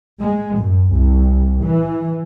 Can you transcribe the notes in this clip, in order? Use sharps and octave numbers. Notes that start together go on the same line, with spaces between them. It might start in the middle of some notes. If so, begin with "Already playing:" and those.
G#3
F#2
C2
E3